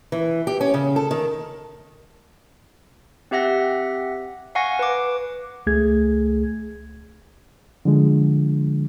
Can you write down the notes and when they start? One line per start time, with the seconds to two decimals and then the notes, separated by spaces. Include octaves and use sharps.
0.12 E3
0.47 G4
0.61 C#4
0.74 C#3
0.96 A4
1.11 D#3
3.31 C4 G4 E5 F#5 A#6
4.55 F5 F#5 G#5 C#6 A#6
4.79 B4 D6
5.67 C#2 A3 G#4 G#6
7.85 D3 F3 G#3